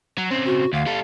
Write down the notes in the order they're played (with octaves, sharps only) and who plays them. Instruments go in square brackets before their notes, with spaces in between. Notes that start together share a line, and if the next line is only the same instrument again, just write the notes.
[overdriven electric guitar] F#3
C#3 C4
[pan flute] F#4
[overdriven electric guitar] D2 [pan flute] F5
[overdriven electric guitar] G3 A4